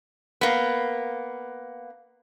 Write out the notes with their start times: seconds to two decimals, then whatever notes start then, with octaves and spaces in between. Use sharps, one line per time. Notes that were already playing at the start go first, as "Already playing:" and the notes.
0.41 A#3 B3